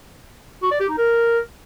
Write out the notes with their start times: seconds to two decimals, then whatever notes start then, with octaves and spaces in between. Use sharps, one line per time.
0.62 F#4
0.71 D5
0.80 G4
0.89 D#4
0.97 A#4